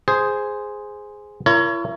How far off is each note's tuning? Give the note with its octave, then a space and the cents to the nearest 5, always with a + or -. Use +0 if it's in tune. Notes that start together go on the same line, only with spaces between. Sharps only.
G#4 +0 C5 -5
E4 +45 A#4 +0 C#5 +20